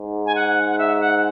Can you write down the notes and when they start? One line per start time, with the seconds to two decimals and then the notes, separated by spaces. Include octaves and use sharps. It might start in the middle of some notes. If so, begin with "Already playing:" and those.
Already playing: G#2
0.26 G#5
0.35 F#5
0.70 F#5
0.78 E5
1.00 F#5